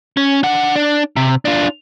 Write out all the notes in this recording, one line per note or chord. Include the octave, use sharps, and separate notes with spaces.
C#4
D4 F#5
D4
C3
D4 F4